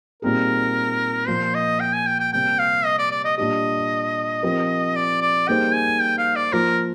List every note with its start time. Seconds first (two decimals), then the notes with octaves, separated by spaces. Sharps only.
0.22 A#2 G3 C4 D#4 G#4 A#4
1.28 A#2 F3 A#3 C5
1.54 D#5
1.80 G5
1.93 G#5
2.06 G5
2.20 G5
2.33 C3 G3 A#3 G5
2.59 F5
2.85 D#5
2.99 D5
3.11 D5
3.24 D#5
3.38 A#2 G3 D4 G4 D#5
4.43 F3 C4 G4 A#4
4.96 D5
5.21 D5
5.48 G3 A#3 D#4 G#4 C5 G5
5.74 G#5
6.00 G5
6.18 F5
6.36 D5
6.53 F3 A#3 F4 A#4 C5